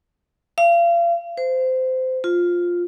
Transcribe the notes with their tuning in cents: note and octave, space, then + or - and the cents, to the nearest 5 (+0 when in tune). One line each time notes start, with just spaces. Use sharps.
F5 -35
C5 -20
F4 +5